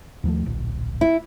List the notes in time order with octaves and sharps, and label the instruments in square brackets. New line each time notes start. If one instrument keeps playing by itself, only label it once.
[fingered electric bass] D#2 F3 A3
D1 A#1
[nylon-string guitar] E4